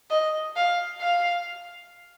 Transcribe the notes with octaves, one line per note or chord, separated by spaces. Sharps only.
D#5
F5
F5